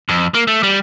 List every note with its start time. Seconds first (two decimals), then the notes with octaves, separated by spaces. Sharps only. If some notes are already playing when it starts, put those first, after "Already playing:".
0.09 F2
0.34 A#3
0.47 A3
0.63 G3